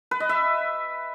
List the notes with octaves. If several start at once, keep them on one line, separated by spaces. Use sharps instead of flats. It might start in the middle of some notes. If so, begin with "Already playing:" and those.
B4
D#5
E5